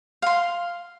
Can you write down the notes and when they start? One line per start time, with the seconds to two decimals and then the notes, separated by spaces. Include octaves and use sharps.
0.22 F5 C6